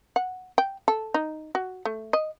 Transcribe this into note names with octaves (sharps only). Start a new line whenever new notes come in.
F#5
G5
A4
D#4
F#4
A3
D#5